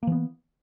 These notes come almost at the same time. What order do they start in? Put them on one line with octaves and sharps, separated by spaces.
A#3 E3 B3